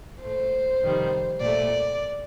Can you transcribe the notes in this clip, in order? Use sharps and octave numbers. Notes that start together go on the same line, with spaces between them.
A2 A3 C5
F2 C3 D#3 G3
A#2 A3 D5